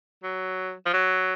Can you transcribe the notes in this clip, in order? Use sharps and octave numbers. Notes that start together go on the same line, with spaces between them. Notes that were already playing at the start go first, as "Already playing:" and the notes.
F#3
F3
F#3